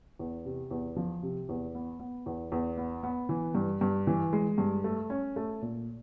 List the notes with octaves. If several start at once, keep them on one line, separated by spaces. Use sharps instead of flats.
E2
C3
E2
F3
C3
E2
B3
B3
E2
E2
B3
B3
E3
G2
G2
E3
G#3
G2
A3
C#4
A3
A#2